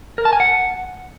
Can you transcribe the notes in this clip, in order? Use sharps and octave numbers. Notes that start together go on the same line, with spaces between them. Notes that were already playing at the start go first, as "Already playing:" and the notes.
A#4
A5
G#5
F#5